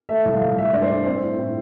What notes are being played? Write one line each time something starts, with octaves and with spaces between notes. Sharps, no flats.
A3 E5
C2
F5
C2
A3 E5
G2 D5
C5
G2
C4 C5
A2
A2